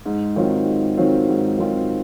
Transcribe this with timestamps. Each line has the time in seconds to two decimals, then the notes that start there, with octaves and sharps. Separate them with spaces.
0.06 G#2
0.36 D#3 F#3 C4 F4
0.66 G#2
0.97 D#3 F#3 C4 F4
1.28 G#2
1.59 D#3 F#3 C4 F4